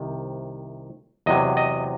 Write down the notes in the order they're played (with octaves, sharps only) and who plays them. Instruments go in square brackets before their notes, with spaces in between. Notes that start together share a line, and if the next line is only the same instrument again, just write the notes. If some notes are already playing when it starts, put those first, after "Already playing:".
Already playing: [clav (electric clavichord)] C2 C3 D#3
E2 C3 F#3 D#5
D#5